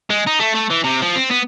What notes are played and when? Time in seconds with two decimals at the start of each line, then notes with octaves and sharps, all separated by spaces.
0.10 G#3
0.27 D#4
0.39 A3
0.54 A3
0.70 E3
0.84 C3
1.02 F3
1.16 C4
1.31 B3